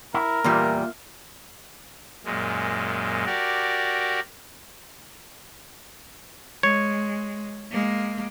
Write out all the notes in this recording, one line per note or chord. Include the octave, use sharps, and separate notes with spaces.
E4 A#4
E2 A#2 G3 A#3 F4 E5
F#2 A#2 G#3
F#4 G4 A#4 D5
G#3 C#5
G#3 A#3